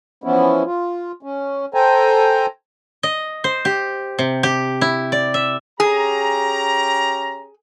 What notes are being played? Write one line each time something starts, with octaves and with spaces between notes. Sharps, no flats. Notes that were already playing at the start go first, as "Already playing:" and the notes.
E3 F3 B3 C#4 E4
F4
C#4
A4 C5 G5 G#5 A#5
D#5
C5
G4
C3
G4
E4
D5
E5
C#4 G4 G#4 A#5